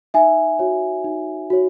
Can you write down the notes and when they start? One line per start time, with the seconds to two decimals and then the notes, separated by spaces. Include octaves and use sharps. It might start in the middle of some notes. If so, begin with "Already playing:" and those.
0.14 D#4 E5 G#5
0.59 F#4 C#5
1.04 D#4
1.50 F#4 C#5